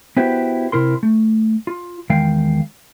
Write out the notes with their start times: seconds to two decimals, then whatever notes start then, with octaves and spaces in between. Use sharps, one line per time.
0.17 B3 E4 F#4 G4 B4 C5
0.72 C3 E4 A#4 C6
1.03 A3
1.67 F4
2.10 E2 D#3 G#3 F5 G5